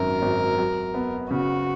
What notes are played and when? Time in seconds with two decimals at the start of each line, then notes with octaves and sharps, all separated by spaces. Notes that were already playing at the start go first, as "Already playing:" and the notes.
Already playing: G#1 F#2 D#3 A#4
0.22 G#1
0.58 F#3
0.94 B3
1.30 C#3 F#4